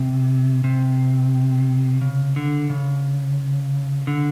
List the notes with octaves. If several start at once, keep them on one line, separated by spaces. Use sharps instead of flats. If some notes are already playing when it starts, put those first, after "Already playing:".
Already playing: C3
C3
C#3
D3
C#3
D3